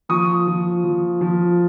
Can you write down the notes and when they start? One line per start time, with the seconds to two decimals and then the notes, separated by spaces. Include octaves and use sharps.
0.09 F3 C#6 D#6
0.47 F3
0.84 F3
1.21 F3